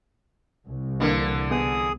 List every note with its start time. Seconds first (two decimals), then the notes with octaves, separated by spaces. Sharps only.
0.67 C2
1.00 D3 E3 A#3 D4
1.51 B3 G#4 D#6